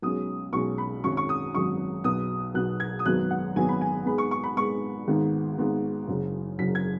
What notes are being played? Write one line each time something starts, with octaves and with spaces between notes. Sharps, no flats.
B1 B2 G#3 C#4 D#6
B1 B2 G#3 C#4 C#6
B5
G#1 F#2 F#3 C#4 C#6
C#6
D#6
G#1 F#2 F#3 C#4 C#6
B1 B2 B3 D#6
B1 B2 B3 F#6
G#6
D#6
G#1 F#2 F#3 B3 F#6
F#5
G#1 F#2 F#3 B3 G#5
B5
G#5
G#2 G#3 B3 B5
C#6
C#6
B5
G#2 G#3 B3 C#6
G#1 G#2 D#3 B3
G#1 G#2 D#3 B3
F#1 F#2 C#3
F#1 F#2 C#3 B6
G#6